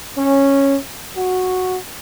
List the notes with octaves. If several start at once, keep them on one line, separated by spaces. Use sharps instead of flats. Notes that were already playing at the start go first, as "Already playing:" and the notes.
C#4
F#4